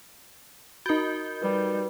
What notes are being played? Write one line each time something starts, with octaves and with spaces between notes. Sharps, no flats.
D#4 F#4 A#4 G6
G3 B4